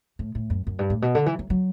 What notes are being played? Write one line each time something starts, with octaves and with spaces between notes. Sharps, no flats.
A2
A2
F#2
F#2
G2
A2
B2
D3
E3
F#3
F#3